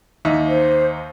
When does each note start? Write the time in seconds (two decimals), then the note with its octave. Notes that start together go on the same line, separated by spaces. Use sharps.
0.25 D#2 D#4 E5
0.49 C5